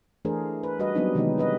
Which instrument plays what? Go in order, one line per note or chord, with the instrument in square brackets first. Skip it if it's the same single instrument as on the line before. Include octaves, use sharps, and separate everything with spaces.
[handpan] E3 A3 D4 G#4 A#4 C5
B4
G3 F#4 B4 D#5
F#3 G3 B3 C4 D4 D#4
C3 D#3 E3 G#3 B3 D#4
F4 B4 D#5